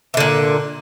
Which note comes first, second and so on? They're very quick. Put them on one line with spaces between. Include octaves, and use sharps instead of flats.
E3 D3 A#2